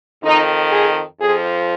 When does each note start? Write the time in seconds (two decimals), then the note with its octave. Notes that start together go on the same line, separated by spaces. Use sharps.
0.23 F2 D#3 D#4
0.72 G#4
1.20 F2 F3 G#4